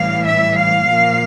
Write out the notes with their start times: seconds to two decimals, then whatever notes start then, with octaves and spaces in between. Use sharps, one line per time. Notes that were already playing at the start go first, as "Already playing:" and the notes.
Already playing: A2 E3 G3 F5
0.26 E5
0.56 F5
0.87 A#2 F3 A#3